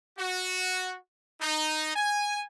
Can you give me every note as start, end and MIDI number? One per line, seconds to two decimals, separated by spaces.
0.18 0.96 66
1.41 1.95 63
1.95 2.43 80